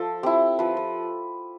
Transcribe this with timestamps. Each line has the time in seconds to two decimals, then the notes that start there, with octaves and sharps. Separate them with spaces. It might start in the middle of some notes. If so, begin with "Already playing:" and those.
Already playing: F3 A4
0.23 C4 E4 G4
0.59 F3 B4
0.77 B4